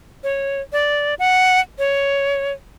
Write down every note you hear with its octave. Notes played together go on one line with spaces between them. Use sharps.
C#5
D5
F#5
C#5